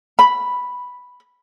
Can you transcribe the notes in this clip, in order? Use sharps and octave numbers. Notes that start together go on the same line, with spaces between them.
B5